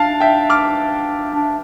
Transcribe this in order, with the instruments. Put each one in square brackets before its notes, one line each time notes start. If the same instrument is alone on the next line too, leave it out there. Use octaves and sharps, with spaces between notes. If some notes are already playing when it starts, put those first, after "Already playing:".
Already playing: [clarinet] D4 [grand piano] F5 A5
[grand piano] E5 G5
D6 F6
[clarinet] D4